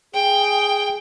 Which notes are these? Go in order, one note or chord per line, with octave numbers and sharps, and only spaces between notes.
G#4 G5